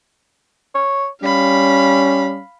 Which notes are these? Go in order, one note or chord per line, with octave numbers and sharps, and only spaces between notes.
C#5
G3 C#4 F5 B5